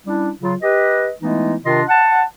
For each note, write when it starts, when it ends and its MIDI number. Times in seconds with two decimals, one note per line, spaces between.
0.06 0.30 55
0.06 0.30 61
0.06 0.30 62
0.06 0.30 64
0.42 0.54 49
0.42 0.54 54
0.42 0.54 65
0.61 1.10 67
0.61 1.10 71
0.61 1.10 75
1.21 1.55 52
1.21 1.55 56
1.21 1.55 57
1.21 1.55 59
1.21 1.55 63
1.21 1.55 64
1.65 1.83 48
1.65 1.83 51
1.65 1.83 62
1.65 1.83 65
1.65 1.83 75
1.65 1.83 84
1.88 2.23 78
1.88 2.23 81